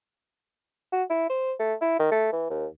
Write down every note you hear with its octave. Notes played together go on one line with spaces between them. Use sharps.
F#4
E4
C5
A3
E4
D#3
A3
E3
D#2